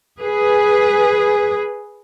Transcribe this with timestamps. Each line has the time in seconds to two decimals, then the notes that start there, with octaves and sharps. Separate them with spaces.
0.21 G#4 B4